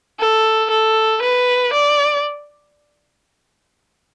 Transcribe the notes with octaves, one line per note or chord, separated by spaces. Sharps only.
A4
A4
B4
D5